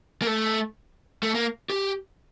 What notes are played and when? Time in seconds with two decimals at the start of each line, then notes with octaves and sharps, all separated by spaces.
0.22 A#3
0.27 A3
1.23 A3
1.35 A#3
1.70 G4